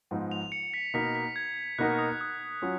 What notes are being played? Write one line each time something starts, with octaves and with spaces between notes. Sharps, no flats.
G#2 F3 B3 D#4
F7
C#7
B6
B2 A#3 D#4 A#4 B6
B6
G#6
B2 A#3 D#4 F#4 A#4 F#6
D#6
D#6
F#3 C#4 F4